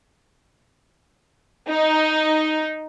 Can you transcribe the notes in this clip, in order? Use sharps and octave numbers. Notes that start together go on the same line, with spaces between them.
D#4